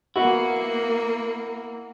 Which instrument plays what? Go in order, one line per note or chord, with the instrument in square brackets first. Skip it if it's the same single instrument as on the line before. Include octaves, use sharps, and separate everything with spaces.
[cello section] A#3 [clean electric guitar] B3 E4 [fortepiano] F#4